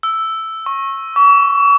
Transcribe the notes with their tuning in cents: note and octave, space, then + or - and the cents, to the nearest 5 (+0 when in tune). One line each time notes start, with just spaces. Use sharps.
E6 +0
C#6 -25
C#6 +40